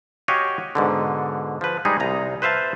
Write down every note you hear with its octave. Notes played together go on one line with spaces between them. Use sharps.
F#4 G4 C#5 D#5 F5 G#5
G#2 B2 D3
F3 B4
G3 G#3 D#4 G#4
C2 A#5
B4 C5 E5 F5 A5